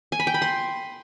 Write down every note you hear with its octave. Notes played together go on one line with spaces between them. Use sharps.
G#5
B5
G5
B5
C6